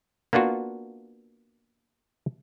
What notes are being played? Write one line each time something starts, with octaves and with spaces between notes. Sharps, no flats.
A#3 B3 D4 F4 F#4